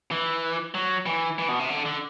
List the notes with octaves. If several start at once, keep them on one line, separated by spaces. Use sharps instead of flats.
E3
F#3
E3
E3
B2
C3
D3
D3